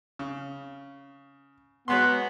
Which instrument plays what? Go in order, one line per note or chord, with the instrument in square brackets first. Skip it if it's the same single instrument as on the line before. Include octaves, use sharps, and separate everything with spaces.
[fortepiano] C#3
[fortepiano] F#3 G#3 C6 [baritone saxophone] B3